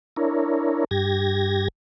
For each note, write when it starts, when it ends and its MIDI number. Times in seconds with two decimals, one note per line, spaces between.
0.16 0.85 62
0.16 0.85 64
0.16 0.85 70
0.16 0.85 73
0.91 1.68 43
0.91 1.68 67
0.91 1.68 92
0.91 1.68 94